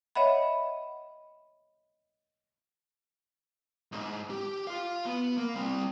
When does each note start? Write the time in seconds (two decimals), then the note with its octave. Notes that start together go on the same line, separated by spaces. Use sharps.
0.15 C#5 D#5 E5 F#5 B5
3.92 B1 G#2
4.30 G4
4.67 F4 F5
5.06 B3
5.37 A#3
5.55 G3 C4